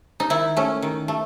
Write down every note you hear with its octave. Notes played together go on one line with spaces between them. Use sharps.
D#4
D#3 E4
A3 C#4
D#3
A3